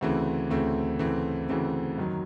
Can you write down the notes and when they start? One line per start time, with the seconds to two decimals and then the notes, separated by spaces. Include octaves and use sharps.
0.01 D2 C#3 E3 A3 C4
0.50 D2 C#3 E3 A3 C4
0.99 D2 C#3 E3 A3 C4
1.49 D2 C#3 E3 A3 C4
1.98 F#2 D#3 F#3